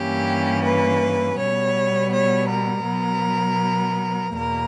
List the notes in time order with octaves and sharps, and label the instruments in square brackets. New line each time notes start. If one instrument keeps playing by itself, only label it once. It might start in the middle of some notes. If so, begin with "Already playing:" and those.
Already playing: [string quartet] G2 E3 A#3 C#4 G4
B4
B2 G3 B3 C#5
C#5
A#4
B2 F#3 B3
E2 B2 A#3 A#4